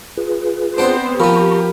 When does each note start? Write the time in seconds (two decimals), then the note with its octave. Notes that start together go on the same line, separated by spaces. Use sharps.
0.17 F4 G#4 B4
0.78 B3 C4 D4 C5 F#5 C6
1.20 F3 B3 G4 A#4 A#5 B5 C#6